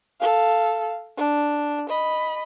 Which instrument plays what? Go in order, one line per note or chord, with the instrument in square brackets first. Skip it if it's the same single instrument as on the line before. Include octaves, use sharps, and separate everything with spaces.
[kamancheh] A4 F5
D4
D#5 B5